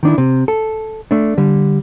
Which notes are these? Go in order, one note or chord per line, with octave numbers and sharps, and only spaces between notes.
D#3 D4 E4
C3
A4
A3 D4
D3 G3